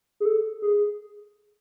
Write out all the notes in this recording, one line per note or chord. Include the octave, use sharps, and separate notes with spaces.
G#4
A4
G#4